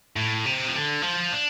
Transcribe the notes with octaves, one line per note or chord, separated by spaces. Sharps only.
A2
C3
F3
D3
F3
D4